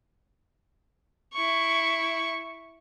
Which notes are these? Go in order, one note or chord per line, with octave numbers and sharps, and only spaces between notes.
E4 C#6